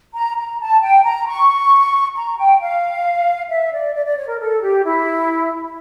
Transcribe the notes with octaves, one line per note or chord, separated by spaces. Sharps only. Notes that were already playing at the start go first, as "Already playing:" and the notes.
A#5
A#5
A5
G5
A#5
C#6
A#5
G5
F5
E5
D5
D5
D5
C#5
A#4
A4
G4
E4